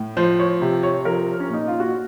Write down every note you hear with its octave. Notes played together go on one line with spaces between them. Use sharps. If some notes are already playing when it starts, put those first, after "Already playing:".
Already playing: A2
F3 C5
C#5
C3
C#5
F3 A#4
C#4
A#2 D#4
F4
F#4